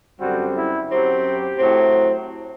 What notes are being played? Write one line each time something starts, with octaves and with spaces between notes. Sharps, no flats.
F#2 D3 G3 C4 F#4
E4
F#2 F#3 C4 G4
A2 F#3 C4